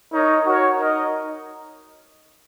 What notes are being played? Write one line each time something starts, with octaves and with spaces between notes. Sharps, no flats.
D#4 A#4 C#5
F#4 A#4 C#5
D#4 A#4 D#5